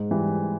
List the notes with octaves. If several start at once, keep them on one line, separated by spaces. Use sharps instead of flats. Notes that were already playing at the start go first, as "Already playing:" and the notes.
Already playing: G#2
E3 G3